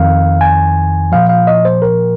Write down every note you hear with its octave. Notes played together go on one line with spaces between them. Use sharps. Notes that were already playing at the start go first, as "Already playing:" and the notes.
Already playing: F2 D#3 F5
G#5
A#2 F3 F5
F5
D#5
C5
A#4